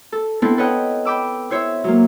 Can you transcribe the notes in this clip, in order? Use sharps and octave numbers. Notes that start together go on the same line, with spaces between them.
A4
B3 C4 D4 E4 A4
A4 B4 C#5 D#5 F#5 G5
G5 B5 D6 E6
E4 C5 C#5 E5
F#3 A#3